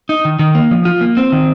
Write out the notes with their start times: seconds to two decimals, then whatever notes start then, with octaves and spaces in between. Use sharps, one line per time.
0.09 D#4
0.25 D#3
0.39 D#3
0.55 A#3
0.71 F3
0.85 F4
1.01 A#3
1.17 C4
1.32 D#3